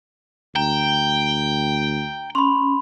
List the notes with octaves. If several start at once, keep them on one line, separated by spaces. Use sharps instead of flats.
D2 G5 A#5
C#4 B5 C6